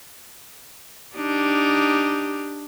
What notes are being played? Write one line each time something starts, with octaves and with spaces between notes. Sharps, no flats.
D4 D#4 G4